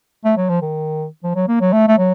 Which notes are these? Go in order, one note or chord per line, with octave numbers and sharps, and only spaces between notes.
A3
F#3
F3
D#3
F3
F#3
A#3
F#3
A3
A3
F#3